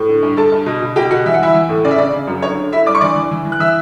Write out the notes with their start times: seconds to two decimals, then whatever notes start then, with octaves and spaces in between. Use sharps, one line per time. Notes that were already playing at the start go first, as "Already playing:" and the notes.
Already playing: A2
0.09 D3
0.22 G2
0.37 G2 A4 A5
0.52 G2
0.66 B2
0.82 B2
0.96 B2 G4 G5
1.11 B2 F#4 F#5
1.26 E3 E5
1.34 F#5
1.39 E3 E4 E5
1.55 E3
1.69 A2
1.85 C#3 D5
1.91 E5
1.98 C#3 D5
2.13 C#3
2.27 F#2
2.42 D3 C#5
2.57 D3
2.72 D3 E4 E5
2.86 G2 D5 D6
2.95 C#6
3.01 E3 D5 D6
3.16 E3
3.31 E3
3.45 E3
3.52 F#6
3.59 E3 E5 E6